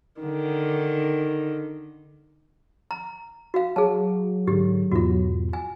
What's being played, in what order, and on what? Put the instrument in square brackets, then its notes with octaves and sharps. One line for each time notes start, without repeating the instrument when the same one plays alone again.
[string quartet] D3 D#3
[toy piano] A#5
F#4 F5
[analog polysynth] F#3 [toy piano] G#4 A5
[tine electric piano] G#2 D3 [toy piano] G4
[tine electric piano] E2 G#2 B2 [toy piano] F4 F#4
[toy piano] G#5